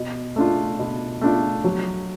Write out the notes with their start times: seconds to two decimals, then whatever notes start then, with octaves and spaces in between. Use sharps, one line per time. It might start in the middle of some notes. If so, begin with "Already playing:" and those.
Already playing: B2
0.36 A3 D4 F4
0.79 B2
1.21 A3 D4 F4
1.64 F#3